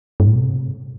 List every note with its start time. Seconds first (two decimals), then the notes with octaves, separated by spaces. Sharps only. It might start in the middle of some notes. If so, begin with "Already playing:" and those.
0.20 G2
0.27 A2
0.35 B2
0.42 C3